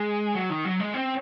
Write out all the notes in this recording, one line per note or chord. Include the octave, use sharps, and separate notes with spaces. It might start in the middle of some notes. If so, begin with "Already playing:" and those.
Already playing: G#3
F#3
D#3
F#3
G#3
C4